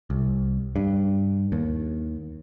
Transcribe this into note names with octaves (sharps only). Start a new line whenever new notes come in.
C2
G2
D#2